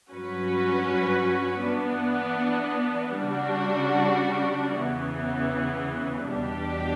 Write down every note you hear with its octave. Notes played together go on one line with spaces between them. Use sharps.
G2 F#3 C#4 F#4 B4
E3 B3 D4
C#3 G3 D4 F#4
E2 C#3 E3 B3
E2 B2 G3 D4 G4